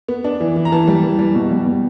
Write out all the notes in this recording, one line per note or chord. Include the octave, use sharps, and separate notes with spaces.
B3
D4
E3
E3
A#5
E3 A5
G3
E3
G3
B2
G3
B2